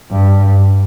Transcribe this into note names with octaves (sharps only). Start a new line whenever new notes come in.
G2